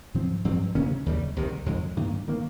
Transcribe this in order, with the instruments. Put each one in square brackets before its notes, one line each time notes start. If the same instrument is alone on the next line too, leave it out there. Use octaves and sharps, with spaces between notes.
[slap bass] G#2 F3 C4
G2 F3 C4
C3 D#3 A#3 C#4
D#2 C#3 G3
C2 C3 D#3
F2 D#3 G#3
G2 D#3 A#3
D#3 A#3